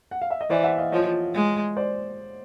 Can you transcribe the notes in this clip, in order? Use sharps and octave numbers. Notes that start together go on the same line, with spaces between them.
F#5
F5
E5
D#5
E3 C5 D5
E5 F#5
D#5 F5
F3 C#5 D#5
G#3
C5 D5